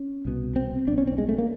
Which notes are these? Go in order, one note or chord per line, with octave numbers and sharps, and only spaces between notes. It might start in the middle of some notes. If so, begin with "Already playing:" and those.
Already playing: C#4
C2 B2
C4
B1 B2 D4
C#4
C4
G#3
A3
A#3